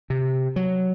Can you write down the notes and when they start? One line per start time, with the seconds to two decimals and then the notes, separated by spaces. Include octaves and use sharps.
0.10 C3
0.56 F#3